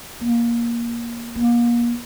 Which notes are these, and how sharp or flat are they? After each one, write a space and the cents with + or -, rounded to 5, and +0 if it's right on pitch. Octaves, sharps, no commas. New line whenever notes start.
A#3 +15
A#3 +35